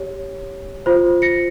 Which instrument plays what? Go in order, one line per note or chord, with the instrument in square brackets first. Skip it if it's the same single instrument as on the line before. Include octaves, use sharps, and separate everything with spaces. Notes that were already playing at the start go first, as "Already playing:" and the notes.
Already playing: [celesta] G4 C#5
F4 C5
A#6 C#7